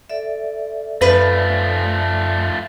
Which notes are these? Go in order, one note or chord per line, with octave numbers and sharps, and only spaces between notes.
A4 D5 E5
F#2 F3 A3 B4